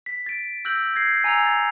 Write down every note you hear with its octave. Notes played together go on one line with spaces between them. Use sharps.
B6
A6 D7
E6 F#6 G6 A#6 F#7
G6 G#6 A#6 C7
G#5 A#5 E6 G#6 C#7 F7
A6